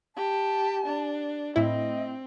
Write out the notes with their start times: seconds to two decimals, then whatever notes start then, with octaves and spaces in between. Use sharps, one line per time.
0.16 G4 A5
0.86 D4
1.56 A2 C4 E4 D#5